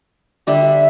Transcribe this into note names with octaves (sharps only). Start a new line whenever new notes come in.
D3 G3 D4 E5